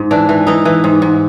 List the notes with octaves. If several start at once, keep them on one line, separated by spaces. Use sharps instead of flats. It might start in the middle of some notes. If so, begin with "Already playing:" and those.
Already playing: G#2
E3 D4
E3
E3 D#4
E3
G#2
G#2